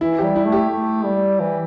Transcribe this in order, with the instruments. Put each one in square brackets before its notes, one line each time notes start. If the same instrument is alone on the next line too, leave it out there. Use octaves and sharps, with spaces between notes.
[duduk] E3 [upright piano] E4
[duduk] G3 [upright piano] G4
[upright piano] E4
[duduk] A3
[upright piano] G4
[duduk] A3
G3
E3